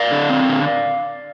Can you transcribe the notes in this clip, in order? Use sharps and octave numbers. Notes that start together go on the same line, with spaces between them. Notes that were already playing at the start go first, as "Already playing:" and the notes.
Already playing: D5 F5
D3
C4
D3